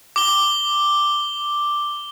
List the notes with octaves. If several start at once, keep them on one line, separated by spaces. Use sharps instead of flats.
D6 G7